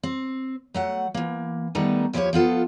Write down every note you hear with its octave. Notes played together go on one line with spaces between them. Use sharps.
C4
F#3 A3 F#5
E3 A#3
D#3 G3 A3 B3 D#4
D#2 F3 E4 F#4 G4 C#5
F3 B3 F4 A4